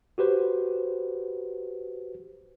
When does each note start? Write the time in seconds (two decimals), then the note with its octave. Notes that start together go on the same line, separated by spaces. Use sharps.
0.18 F#4 G4 B4 C5